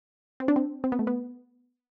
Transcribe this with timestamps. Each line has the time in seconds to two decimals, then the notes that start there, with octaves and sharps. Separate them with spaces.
0.40 C4
0.48 D4
0.56 C4
0.84 C4
0.92 B3
0.99 A3
1.07 B3